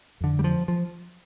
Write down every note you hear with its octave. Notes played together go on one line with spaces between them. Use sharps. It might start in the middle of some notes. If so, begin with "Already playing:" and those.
F2 D3
G3
F3
F3